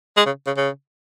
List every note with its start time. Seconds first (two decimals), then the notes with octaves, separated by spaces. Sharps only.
0.17 G#3
0.26 C#3
0.47 C#3
0.57 C#3